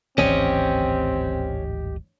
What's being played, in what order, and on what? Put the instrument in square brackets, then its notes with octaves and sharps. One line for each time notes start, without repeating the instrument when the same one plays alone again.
[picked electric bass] D1 G#1 E3 [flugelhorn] C4 [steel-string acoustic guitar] C#4 [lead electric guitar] G4 D#5